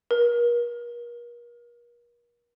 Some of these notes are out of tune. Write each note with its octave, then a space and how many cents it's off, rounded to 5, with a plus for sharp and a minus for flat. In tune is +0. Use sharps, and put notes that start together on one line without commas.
A#4 +40